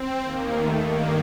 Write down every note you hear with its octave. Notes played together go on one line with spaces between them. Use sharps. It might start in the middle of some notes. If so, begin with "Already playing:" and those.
Already playing: C4
D#2 D#3 A#3
A3
G2 D#3 A#3